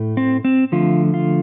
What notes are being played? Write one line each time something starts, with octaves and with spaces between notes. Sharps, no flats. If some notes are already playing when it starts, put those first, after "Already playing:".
Already playing: A2 A3
C4
C4
D3 F3 A3 F4
F4